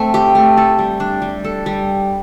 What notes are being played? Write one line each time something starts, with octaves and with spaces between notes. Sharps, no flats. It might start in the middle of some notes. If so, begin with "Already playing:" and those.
Already playing: A3 C4
G4
A3
A4
G3
D4
G3
A4
G3